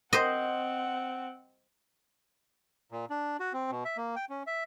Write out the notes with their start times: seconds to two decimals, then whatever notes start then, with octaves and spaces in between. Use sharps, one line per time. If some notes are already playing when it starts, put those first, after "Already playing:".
0.13 C4 C5 D#5 F#5
2.91 A#2
3.10 D4
3.40 F#4
3.53 C4
3.71 B2
3.85 E5
3.97 A#3
4.16 G5
4.30 C#4
4.47 E5